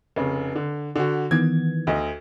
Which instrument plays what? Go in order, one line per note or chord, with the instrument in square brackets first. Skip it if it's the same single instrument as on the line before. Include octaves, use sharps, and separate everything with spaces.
[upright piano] F1 C#3
D3
D3 F#4
[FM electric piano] D#3 E3 B3 [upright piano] G#6
[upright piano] D2 D#5